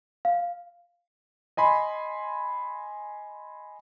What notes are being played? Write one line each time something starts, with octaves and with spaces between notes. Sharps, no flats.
F5
D#5 G#5 B5 C6